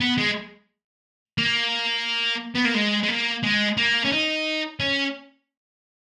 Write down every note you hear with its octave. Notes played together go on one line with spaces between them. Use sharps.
B3
G#3
A#3
B3
A#3
G#3
G#3
A#3
G#3
A#3
C#4
D#4
C#4